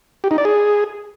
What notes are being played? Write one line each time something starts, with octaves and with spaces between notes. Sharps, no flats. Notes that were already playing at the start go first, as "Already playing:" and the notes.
G4
D#4
D5
G#4